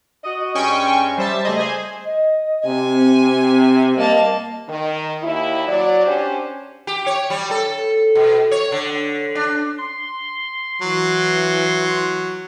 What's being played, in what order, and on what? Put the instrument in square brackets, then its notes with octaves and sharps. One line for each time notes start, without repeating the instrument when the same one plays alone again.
[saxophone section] F#4 D#5
[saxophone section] G2 G#3 C#4 [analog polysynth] G5 G#5 C#6
[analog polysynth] G3 E5 A5 [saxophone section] C5
[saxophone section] C#3 G3 [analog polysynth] A3 G#4 D#5
[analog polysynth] G#4 C5 G#5
[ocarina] D#5
[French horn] C3 [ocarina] C4 [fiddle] G#5
[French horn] G3 [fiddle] A#3 A5 [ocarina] D#5
[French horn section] D#3
D#2 E4
F#3 D5
C#4 D4 G4 C5 C#5
[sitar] G4
C#5
G3
A4
B2
C#5
D3
D4
[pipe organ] C6
[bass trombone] E3 [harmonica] F#3